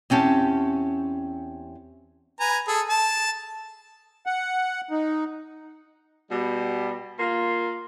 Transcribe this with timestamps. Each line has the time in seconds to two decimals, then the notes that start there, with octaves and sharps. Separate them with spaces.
0.10 E2 C4 C#4 G4 A5
2.40 B4 G#5 A#5
2.67 G#4 A4
2.89 A5
4.26 F#5
4.91 D#4
6.30 B2 G3
7.19 A#3 F4